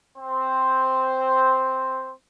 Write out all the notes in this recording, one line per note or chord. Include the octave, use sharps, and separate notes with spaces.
C4 C5